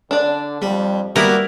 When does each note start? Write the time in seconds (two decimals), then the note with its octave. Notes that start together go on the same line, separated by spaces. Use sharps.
0.11 D3 D4 D5
0.62 F2 G3
1.16 G3 A#3 B3 E4 F#4 A#4 D6